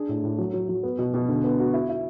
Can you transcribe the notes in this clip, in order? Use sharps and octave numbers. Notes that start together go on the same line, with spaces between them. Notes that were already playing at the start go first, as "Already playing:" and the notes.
Already playing: D4 G#4
A2
A2
F#3
F#3
F#3
B3
B2
B2
D3
B3
F#4
E4
E4